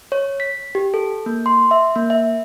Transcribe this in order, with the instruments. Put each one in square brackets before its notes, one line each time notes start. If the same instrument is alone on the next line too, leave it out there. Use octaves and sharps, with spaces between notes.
[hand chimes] C#5
B6
G4
A4
A#3
C6
E5
A#3
E5